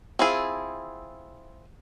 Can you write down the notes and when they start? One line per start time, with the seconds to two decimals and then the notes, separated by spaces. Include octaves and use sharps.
0.19 C4 E4 F4 G#4